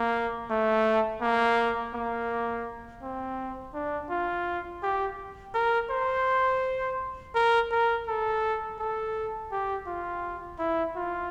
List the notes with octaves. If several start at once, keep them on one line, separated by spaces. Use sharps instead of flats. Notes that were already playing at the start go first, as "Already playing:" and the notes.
Already playing: A#3
A3
A#3
A#3
C4
D4
F4
G4
A#4
C5
A#4
A#4
A4
A4
G4
F4
E4
F4